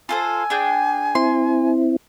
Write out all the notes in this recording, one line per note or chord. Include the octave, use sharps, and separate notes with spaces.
F4 A4 C5 G#5
D4 G#4 G5
C4 E4 C6